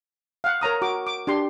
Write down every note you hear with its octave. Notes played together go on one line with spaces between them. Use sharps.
F5 F#5
A#4 C#5 A#5 D#6
F#4 D6
D6
D4 G4 C6